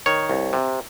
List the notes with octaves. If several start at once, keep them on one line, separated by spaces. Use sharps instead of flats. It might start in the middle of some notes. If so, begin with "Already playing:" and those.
D#3 C#5
C2
C3